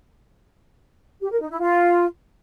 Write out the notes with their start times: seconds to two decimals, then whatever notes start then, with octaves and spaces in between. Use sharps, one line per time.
1.21 G4
1.31 A#4
1.41 D#4
1.51 E4
1.61 F4